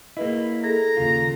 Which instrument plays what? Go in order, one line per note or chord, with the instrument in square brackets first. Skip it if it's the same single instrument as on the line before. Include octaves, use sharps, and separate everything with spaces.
[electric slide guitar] A#3 E4 [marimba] G#4 B4 D#5
[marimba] G#4 A4 [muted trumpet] A#5
[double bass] D#2 C#3 [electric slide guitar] F4